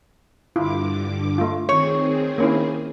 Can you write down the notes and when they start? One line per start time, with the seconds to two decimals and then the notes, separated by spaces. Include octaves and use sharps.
0.56 G2 D3 E4 F4 D6
1.38 A3 F4
1.69 D#3 C4 G#4 C#5
2.38 A#3 C#4 E4